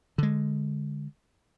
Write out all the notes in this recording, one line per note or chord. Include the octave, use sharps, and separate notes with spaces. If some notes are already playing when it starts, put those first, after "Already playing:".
D3 G#3